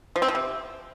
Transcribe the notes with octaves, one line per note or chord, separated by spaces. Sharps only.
F3
C4
F3
C3